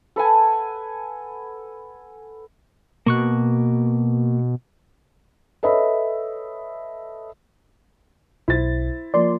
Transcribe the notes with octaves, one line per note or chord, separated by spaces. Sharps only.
A4 B4 F#5 G#5
B2 A#3 C#6 F#6
A4 B4 C#5 D#5 E5 B5
B1 E4 C5 A6
F3 A#3 D5 C6